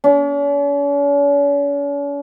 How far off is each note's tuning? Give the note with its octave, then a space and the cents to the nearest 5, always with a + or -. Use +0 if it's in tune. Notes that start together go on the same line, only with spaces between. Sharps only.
C#4 +45